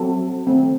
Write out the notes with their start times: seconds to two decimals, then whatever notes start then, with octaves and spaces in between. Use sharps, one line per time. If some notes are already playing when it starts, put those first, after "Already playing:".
Already playing: F#3 C4 F#4 A4
0.47 D#3 A3 C4